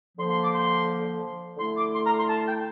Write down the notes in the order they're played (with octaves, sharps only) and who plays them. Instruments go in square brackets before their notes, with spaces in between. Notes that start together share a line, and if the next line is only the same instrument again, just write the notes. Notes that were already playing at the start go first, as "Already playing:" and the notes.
[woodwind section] D3 F3 A#3 C6
C6
D6
C6
D3 A3 E4 C6
D6
C6
A#5
C6
A5
G5